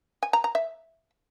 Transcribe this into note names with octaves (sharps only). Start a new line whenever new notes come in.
G#5
A#5
A#5
E5